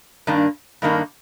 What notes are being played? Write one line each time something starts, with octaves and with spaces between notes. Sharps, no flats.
G2 D#3 A#3 D4
G2 D#3 A#3 D4